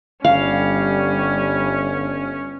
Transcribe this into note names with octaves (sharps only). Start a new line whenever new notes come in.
G1 G3 C#4 F5